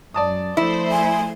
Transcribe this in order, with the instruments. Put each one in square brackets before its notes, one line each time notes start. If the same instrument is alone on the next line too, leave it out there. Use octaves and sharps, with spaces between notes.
[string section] F#2 [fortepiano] D5 A5 D#6
[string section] F3 A3 C5 [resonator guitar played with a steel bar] E4
[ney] G#5